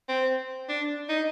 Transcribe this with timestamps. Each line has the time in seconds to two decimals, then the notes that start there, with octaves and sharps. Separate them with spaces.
0.09 C4
0.69 D4
1.09 D#4